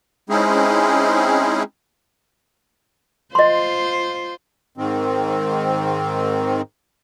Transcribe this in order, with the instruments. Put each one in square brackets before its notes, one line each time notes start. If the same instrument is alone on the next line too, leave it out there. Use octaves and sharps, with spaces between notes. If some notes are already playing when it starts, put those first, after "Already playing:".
[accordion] G#3 C4 C#4 D#4 E4 G#4
[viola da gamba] F4 C5 [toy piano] D#5 C6
[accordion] G#2 D#3 C4